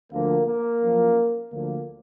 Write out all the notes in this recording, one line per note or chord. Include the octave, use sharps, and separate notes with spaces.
D2 D3 F3 A#3
A#3
F#2 F3
D2 D3 F3 A#3